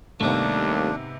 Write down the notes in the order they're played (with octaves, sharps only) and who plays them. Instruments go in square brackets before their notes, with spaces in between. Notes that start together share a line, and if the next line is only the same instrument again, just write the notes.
[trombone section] D#2 [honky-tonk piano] G#2 C3 B3 [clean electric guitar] G3 A3 [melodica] D4